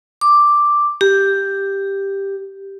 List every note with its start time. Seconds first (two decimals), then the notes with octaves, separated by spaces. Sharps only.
0.21 D6
1.01 G4